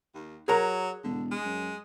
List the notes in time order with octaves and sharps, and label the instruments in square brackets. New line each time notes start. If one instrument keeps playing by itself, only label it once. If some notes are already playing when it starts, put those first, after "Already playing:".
[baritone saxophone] D#2
[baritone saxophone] F#3 [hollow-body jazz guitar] G#4 A#4 A#5
[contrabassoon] E1 [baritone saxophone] D3
[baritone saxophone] G#3
[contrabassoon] F#2